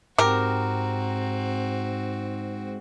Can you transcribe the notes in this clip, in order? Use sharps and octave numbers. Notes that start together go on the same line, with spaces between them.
G#2 C4 F#4 G4 A#4